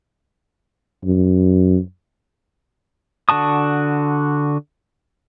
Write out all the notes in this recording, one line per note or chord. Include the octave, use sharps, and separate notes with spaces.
F#2
D3 F#4 A5 D#6